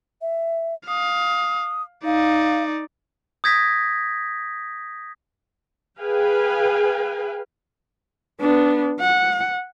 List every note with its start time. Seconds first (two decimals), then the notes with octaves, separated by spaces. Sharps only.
0.22 E5
0.88 F5 D#6
2.05 D#4 D5 F5
3.44 D#6 G6 G#6 A#6 B6
6.00 G#4 B4 F5 G5 G#5
8.41 B3 D4
9.00 F#5